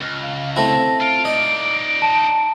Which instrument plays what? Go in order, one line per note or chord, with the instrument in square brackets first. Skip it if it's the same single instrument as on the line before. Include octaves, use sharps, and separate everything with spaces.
[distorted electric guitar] C#2 [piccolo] F6
[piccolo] F5
[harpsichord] A3 C4 E4 [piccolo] A#6
[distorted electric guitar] F4 [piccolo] D7
[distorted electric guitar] D#4 D5 [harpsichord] D#5
[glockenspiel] A5